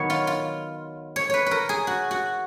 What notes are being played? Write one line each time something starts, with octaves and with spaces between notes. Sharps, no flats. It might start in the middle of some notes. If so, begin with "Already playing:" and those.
Already playing: D#3 F#3 B3 C#5
F4
F4
C#5
B4 C#5
A#4 B4
G#4
F#4
F#4